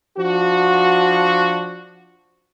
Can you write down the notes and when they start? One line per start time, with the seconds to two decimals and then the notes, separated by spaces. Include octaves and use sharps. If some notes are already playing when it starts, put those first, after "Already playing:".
0.17 F3 D4 F#4